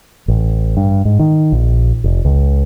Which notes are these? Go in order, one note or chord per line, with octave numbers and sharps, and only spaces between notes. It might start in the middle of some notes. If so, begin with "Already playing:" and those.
A1
G2
G#2
D#3
A#1
F1
C#2